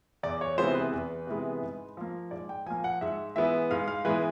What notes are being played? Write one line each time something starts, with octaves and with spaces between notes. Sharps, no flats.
E2 D5
C#5
C3 E3 G#3 B3 C5
B4
E2
C3 E3 G#3 B3
G#2
F3 A#3
G#2 D5
G5
F3 A#3 G#5
F#5
G#2 E5
E3 G#3 B3 E5
G#2 F5
F5
E3 G#3 B3 B4